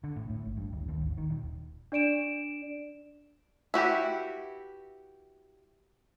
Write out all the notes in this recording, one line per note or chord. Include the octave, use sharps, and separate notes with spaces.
D3
A2
A2
G#1
G2
D1
D#2
G#1
D#3
D#1
D4 D5 D7 E7
E4 F#4 G4 B4